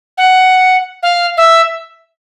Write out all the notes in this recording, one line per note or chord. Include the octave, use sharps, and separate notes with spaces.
F#5
F5
E5